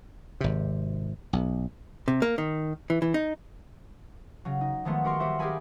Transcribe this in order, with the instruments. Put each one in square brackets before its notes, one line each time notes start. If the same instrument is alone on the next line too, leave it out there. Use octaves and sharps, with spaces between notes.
[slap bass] G#1 C3
B1
[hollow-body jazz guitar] C3
A#3
D#3
E3
E3
D#4
[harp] C#3 F#3
D#4
D#3 F3 G#3 A3 B3
F#4 G4 A#4 C6 C#6
G3 A#3 F#4 C5 E5
G4 G#4 A#4 G#5 B5